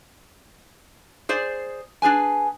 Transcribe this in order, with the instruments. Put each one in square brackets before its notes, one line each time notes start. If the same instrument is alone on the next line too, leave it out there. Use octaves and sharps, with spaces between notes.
[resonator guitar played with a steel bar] G#4 C5 D5
D4 G#4 B4 G#5